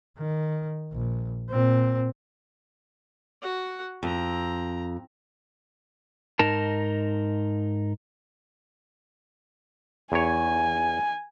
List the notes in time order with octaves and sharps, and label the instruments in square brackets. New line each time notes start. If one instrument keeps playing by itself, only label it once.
[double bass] D#3
A#1
A#2 C4
[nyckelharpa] F#4 F#5
[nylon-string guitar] F2 [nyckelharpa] C4 A#5
[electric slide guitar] G#2 D#4 A#4 A5
[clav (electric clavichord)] E2 C#5 [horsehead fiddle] G#5